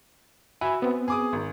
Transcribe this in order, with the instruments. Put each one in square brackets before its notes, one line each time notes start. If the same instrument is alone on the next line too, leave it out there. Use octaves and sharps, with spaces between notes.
[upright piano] F#4 [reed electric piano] E5 G#5 B5
[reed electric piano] B3 C4
[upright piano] G#4 D6 D#6
G#1